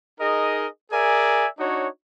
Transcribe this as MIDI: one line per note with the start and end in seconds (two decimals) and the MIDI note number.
0.20 0.67 63
0.20 0.67 68
0.20 0.67 70
0.20 0.67 75
0.91 1.47 68
0.91 1.47 70
0.91 1.47 74
0.91 1.47 76
0.91 1.47 80
1.59 1.87 62
1.59 1.87 63
1.59 1.87 66
1.59 1.87 73